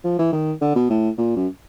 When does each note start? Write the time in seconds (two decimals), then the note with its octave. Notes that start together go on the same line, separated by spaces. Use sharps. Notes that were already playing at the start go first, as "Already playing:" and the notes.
0.04 F3
0.19 E3
0.32 D#3
0.61 D3
0.75 B2
0.90 A2
1.18 A#2
1.36 F#2